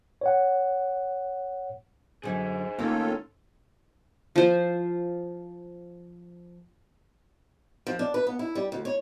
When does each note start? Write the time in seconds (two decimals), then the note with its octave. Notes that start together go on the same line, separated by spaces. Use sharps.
0.21 C#5 F#5
2.23 F#2 D3 G#4 C5
2.79 A2 D#3 A#3 C#4 F4 A4
4.36 F3 C5
7.87 F3
7.99 D4
8.14 B4
8.27 B3
8.39 E4
8.55 G3
8.72 D2
8.85 C#5